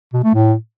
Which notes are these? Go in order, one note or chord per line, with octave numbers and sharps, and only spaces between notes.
B2
A3
A2